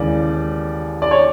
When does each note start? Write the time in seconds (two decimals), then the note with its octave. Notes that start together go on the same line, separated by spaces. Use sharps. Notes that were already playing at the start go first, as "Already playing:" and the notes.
Already playing: D#2 C#3 E3 G#3 D5
1.02 D5
1.11 C#5